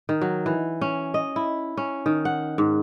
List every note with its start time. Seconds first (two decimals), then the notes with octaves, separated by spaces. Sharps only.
0.09 D#3
0.21 F#3
0.46 E3
0.81 C#4
1.14 D#5
1.36 E4
1.77 C#4
2.06 D#3
2.25 F#5
2.58 G#2